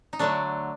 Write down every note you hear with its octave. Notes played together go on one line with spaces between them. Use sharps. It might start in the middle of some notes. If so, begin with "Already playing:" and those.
D#4
D3 F#3 A3 D4